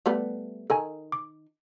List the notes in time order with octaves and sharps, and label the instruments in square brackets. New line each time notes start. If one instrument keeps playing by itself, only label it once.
[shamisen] G3 A3 B3
[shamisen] D#3 A#4 [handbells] A4 G#5
[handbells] D6